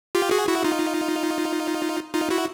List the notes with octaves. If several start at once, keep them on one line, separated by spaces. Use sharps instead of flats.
F4 G4
F#4 G#4
E4 F#4
D#4 F4
D#4 F4
E4 F#4